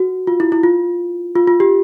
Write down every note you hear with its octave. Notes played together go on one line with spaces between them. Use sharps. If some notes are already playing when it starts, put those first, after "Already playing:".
Already playing: F#4
F4
E4
E4
F4
F4
F4
G4